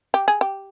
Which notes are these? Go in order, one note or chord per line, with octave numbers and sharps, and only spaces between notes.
G4
G#4
G4